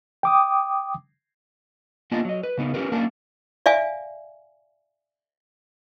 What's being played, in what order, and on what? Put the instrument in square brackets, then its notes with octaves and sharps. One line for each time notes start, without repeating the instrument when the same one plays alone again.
[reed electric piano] G5 D6 D#6
[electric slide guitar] A#3 B3 D4 F4 D#5 A5
F#3 D#5
B4
C#3 B3 D#4
C#4 G4 A#4 B4
A#3 C#4 D4 D5 F5 A5
[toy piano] D5 E5 F5 G#5